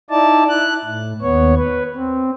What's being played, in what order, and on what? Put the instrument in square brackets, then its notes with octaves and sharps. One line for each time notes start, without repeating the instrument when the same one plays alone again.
[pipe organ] D#4 E4 D5 A5
E4 F#6
A2
D#2 B3 C#5
B4
C4